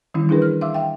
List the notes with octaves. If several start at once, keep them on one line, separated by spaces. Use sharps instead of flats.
D#3 E3 G3 C4 C#4 E4
D4 E4 G#4 A#4 B4
F6
E5 F5 C6 D6 E6
E5 F5 G5